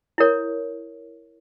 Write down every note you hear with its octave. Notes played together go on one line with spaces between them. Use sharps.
E4 A#4 C#5